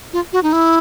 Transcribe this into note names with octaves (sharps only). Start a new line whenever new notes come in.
F4
F#4
D#4
E4